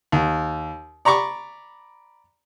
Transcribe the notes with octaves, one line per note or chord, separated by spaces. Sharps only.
D#2
D5 A#5 B5 C#6 D6